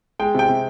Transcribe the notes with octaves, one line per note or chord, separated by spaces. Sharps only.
G#3 G5
C3 G5
C3